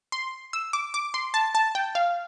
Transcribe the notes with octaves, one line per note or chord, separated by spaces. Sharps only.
C6
E6
D6
D6
C6
A5
A5
G5
F5